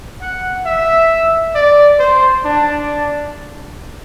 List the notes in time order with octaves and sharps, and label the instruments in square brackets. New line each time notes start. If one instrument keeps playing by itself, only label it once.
[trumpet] F#5
E5
D5
C5
D4